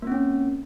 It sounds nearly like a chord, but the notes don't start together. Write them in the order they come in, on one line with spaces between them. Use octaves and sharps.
A#3 C4 C#4